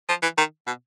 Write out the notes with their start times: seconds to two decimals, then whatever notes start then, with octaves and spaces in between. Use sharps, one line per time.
0.09 F3
0.22 E3
0.38 D#3
0.67 B2